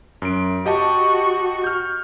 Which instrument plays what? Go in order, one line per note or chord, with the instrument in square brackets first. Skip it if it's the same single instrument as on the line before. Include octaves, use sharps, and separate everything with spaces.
[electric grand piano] F#2 D7
[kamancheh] F#4 C#6 [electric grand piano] G4 D#5 A5
[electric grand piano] F6 G6